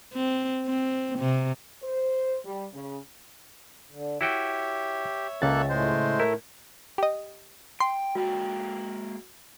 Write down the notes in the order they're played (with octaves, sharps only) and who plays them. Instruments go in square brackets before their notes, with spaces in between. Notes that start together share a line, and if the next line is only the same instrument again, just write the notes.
[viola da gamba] C4
C4
C3
[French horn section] C5
G3
C#3
[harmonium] D3
[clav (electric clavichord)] E4 F#4 G5 [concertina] G4 [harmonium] C#5 E5
[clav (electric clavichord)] C#2 [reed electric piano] C#3 A6 [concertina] A#3 A4 F#6
[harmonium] A2 A3 [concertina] G#3 C5
[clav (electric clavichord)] E4 [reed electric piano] A#4
[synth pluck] G4 D#5
[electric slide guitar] G5 [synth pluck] C6
[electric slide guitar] G#3 A#3 G5 [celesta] F#4